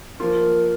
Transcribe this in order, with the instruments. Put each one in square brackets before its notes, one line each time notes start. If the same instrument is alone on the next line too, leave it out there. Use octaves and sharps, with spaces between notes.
[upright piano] F3 A#3 F4 [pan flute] A#4